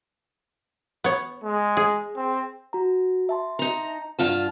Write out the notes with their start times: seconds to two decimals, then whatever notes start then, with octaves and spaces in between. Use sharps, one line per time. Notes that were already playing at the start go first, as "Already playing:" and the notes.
1.04 B3 C#5
1.44 G#3
1.77 G#4
2.16 C4
2.73 F#4 A#5
3.29 E5 A5 C6
3.59 D#4 A#5
4.19 G2 F4 F#5 A5